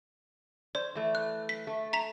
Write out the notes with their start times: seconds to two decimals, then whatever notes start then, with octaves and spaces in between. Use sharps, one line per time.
0.75 C5 D5
0.95 E3 A3
1.15 F#6
1.49 B6
1.67 A3
1.93 A#5 B6 F7